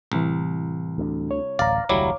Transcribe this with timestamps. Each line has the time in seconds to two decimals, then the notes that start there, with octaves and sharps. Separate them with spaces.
0.12 C2 A2 E3
0.98 D2 D3
1.31 C#5
1.59 D1 A1 D5 F5 A#5
1.89 F1 D2 F#3 G3 E4 C#5 D6